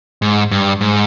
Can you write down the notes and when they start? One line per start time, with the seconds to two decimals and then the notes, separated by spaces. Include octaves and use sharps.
0.22 G#2
0.51 G2
0.81 G#2